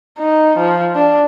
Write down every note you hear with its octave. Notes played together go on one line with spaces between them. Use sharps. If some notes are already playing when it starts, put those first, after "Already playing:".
D#4
F3
D4